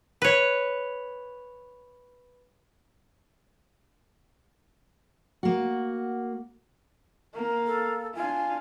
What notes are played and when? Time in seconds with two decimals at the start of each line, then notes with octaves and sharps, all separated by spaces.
0.22 B4 C#5
5.43 A#3 F#4
7.35 A#3 F5
7.67 A4
8.15 D4 F4 G#5